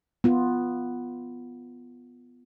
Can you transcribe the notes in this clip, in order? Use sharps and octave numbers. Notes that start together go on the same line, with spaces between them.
B3 F4